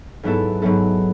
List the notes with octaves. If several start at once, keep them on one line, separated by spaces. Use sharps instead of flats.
G#2 F#3 B3 E4 A4
G#2 F#3 B3 E4 A4